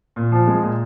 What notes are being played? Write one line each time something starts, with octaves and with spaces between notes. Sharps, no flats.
A#2
F3
G#3
A#2